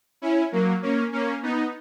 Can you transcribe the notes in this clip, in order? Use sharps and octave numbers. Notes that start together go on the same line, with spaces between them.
C#4 E4
F#3 A#3
A#3 C#4
A#3 C#4
B3 D#4